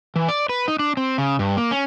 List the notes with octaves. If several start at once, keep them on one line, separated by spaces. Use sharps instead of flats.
E3
D5
B4
D#4
D4
C4
C#3
G2
A#3
C#4